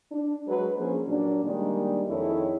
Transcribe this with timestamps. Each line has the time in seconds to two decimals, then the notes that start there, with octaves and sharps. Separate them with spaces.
0.11 D4
0.47 F#3 G#3 B4
0.77 F3 A#3 C#4 D4 G#4 C5
1.08 A#2 F#3 A#3 D4
1.44 D#3 G3 G#3 A#3 D4
2.07 F2 D#3 E4 G#4 A4 C#5